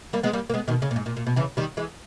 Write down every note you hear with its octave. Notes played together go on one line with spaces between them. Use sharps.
G3 A#3
G#3 B3
G3 A#3
A#3
G#3 B3
B2 D#3
C#3
A#2
G#2
A#2
A#2
B2
C#3 E3
D#3 G3
E3 G#3